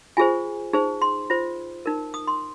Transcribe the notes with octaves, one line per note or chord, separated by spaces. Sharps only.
F4 G#4 C5 G#5
D#4 G#4 C5
C6
F4 C5
D#4 A#4
D#6
C6